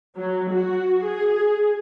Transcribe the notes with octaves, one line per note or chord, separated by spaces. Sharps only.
F#3
F#4
G#4